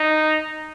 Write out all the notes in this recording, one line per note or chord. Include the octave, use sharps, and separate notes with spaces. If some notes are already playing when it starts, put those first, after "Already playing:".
Already playing: D#4